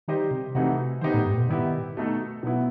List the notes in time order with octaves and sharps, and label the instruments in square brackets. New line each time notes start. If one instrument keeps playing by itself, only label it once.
[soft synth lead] D#3 [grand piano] G3 D#4 G4 C5 D#5
[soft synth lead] C3
[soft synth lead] C3 [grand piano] E3 A3 D#4 F#4
[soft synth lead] D#3 [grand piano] B3 D#4 G4 C5
[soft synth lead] A2
G2
A2
B2
[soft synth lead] D#3 [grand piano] G3 B3 E4 G4
[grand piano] B2 A3 D#4 A4
[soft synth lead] B2 [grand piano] F#3 B3 E4